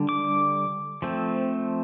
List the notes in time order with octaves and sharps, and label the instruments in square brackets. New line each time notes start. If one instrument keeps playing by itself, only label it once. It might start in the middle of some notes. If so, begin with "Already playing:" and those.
Already playing: [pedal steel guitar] D3 G3 D4
D6
F3 A3 C4